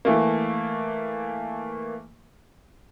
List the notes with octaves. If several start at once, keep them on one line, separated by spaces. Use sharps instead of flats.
E3 A3 A#3